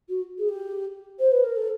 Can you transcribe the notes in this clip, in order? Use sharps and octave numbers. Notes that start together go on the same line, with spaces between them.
F#4
G#4
G4
C5
B4
A#4
A4